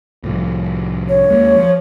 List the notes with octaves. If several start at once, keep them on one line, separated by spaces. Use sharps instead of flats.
C2 A2 F3
C#5
D#2 G#3 A#3
F3